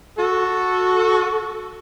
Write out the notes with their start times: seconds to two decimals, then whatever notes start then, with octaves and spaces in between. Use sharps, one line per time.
0.18 F#4 A4